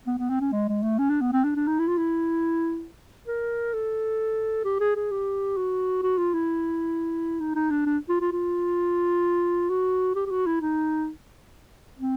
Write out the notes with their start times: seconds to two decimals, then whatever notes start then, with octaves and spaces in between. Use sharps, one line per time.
0.07 B3
0.18 B3
0.30 C4
0.41 C#4
0.52 G#3
0.68 G#3
0.82 A3
0.98 C#4
1.10 D4
1.21 B3
1.32 C4
1.44 D4
1.56 D4
1.67 D#4
1.79 E4
1.88 F4
1.97 E4
3.27 A#4
3.73 A4
4.65 G4
4.80 G#4
4.96 G#4
5.11 G4
5.57 F#4
6.03 F#4
6.18 F4
6.34 E4
7.40 D#4
7.55 D#4
7.71 D4
7.86 D4
8.09 F4
8.21 F4
8.32 F4
9.70 F#4
10.15 G4
10.26 G4
10.31 F#4
10.46 E4
10.61 D#4
11.99 C4